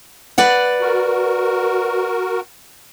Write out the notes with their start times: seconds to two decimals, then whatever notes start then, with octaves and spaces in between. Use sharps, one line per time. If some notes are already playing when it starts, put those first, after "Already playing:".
0.38 B4 D5 F#5
0.81 F#4 A#4